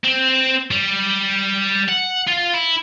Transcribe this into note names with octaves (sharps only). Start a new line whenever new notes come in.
C4
G3
F#5
F4
E4